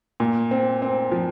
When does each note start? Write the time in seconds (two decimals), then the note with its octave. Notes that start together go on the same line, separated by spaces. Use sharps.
0.20 A#2
0.51 C4
0.82 C4
1.12 F3